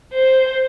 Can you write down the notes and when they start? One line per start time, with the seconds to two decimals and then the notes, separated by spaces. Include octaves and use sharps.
0.13 C5